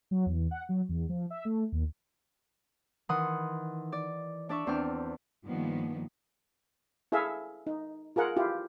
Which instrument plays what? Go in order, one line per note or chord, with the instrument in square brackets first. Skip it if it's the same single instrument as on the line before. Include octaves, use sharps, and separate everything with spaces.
[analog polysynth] F#3
E2
F#5
F#3
E2
F3
E5
A3
D#2
[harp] D#3 E3 D#4 F#5 C6 D#6
D5
D4 D5 E5 C#6
E2 C4 D4 G5 F6
[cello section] G2 D#3 F3 A#3 B3
[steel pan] E4 G#4 A4 E5 F5
D#4
F4 G#4 A#4 F#5
E4 F4 G4